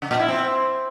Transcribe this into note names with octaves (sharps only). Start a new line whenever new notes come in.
C#3
A#2
E4
C4